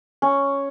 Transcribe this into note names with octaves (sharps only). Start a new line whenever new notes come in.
C#4